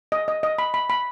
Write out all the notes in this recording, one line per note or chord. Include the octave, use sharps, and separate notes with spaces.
D#5
D#5
D#5
B5
B5
B5